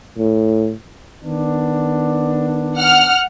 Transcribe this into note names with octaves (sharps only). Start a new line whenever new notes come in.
A2
D#3 B3 D4
F#5 F6